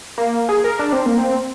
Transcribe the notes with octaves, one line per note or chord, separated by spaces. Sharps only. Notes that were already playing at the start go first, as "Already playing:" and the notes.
A#3
G#4
A#4
D4
C4
A#3
C4